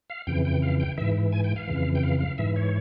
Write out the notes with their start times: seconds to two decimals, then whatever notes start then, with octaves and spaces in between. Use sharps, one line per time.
0.10 F5
0.27 F2 C#3 E3 G5
0.45 G5
0.62 F5
0.80 G5
0.98 G#2 E3 E5
1.32 G#5
1.44 G5
1.56 F5
1.67 F2 C#3 E3
1.95 G5
2.03 F5
2.20 F5
2.38 G#2 E3 E5
2.56 C#5